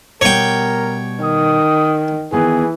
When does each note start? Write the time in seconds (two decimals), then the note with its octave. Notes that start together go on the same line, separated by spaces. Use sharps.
0.21 B2 G3 A#4 C#5 F#5 G5
1.23 D#3 D#6
2.32 D#3 E3 B3 G#4